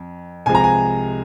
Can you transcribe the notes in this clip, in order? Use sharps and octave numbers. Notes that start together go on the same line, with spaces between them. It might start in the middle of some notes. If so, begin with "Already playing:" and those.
Already playing: F2
C2 C3 F3 G#3 G#5
A#5
G#5